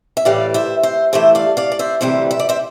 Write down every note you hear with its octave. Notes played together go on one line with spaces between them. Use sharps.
E5
A2 E3 G3 D5 F5
C5 E5
C5 E5
G2 E3 A3 C5 E5
D5 F5
D5 F5
D5
C5 E5
D2 C3 E3 G3 C5 E5
E5
D5
C5 E5